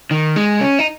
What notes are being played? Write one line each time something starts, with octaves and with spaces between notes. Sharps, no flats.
D#3
G#3
C#4
D#4